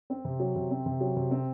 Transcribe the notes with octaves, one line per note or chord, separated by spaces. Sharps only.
C4
C3
F#3
C3
C4
C3
F#3
C3
C4